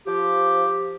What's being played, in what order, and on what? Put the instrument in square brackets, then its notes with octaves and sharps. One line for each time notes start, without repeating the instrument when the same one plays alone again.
[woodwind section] F3 G4